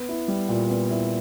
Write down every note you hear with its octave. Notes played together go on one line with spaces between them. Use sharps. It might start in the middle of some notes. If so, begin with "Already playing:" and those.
Already playing: B3
E4
G3
A#2
B3
E4